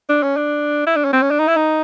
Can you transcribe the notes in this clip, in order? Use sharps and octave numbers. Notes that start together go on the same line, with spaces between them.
D4
C#4
D4
E4
D4
C#4
C4
C#4
D4
D#4
E4
D#4